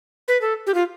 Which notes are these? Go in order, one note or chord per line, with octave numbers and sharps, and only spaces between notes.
B4
A4
G4
F4